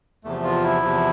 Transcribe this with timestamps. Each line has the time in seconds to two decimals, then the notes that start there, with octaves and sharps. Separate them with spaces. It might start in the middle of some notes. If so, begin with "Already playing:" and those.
0.24 E2 C3 F3 A3
0.44 F4
0.63 E4
0.82 E2 C3 F3